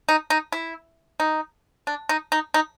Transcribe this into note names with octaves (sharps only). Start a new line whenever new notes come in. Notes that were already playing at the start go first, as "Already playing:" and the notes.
D#4
D#4
E4
D#4
D4
D#4
D#4
D#4